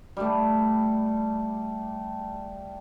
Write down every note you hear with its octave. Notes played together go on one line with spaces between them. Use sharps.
G3 A3